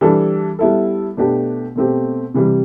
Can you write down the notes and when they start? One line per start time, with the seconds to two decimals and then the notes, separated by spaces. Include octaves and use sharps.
0.01 E3 G3 D4 A4
0.59 G3 B3 E4 A4
1.17 B2 A3 D4 G4 B4
1.76 B2 A3 C4 G4
2.34 C3 E3 G3